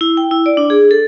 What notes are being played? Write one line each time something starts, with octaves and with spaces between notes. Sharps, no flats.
E4
G5
E4
D5
D4
G#4
A4